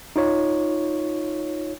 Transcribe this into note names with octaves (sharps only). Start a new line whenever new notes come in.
D#4 F4 C#5